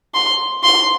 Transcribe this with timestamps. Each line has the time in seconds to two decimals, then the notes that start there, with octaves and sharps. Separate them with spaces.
0.14 C6
0.63 C6